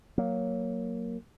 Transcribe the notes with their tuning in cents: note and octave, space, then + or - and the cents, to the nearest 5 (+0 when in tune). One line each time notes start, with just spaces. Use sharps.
F#3 +0 A#3 +0